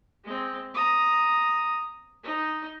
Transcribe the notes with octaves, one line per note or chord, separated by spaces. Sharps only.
G#3 C4
A#5 D#6
D#4